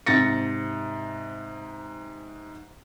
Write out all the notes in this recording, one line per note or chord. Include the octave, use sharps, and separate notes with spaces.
G#2 C3 A6 A#6 C#7